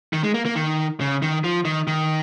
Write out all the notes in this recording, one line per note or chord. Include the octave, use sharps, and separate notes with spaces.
D#3
G#3
A#3
A#3
D#3
C#3
D#3
F3
D#3
D#3